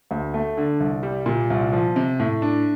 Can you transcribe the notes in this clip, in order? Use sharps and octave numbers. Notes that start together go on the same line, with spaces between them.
D2
A3
D3
C2
G3
A#2
C2
F3
C3
A2
D4